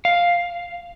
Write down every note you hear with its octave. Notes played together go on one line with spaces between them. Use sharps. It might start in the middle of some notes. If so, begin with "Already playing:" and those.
F5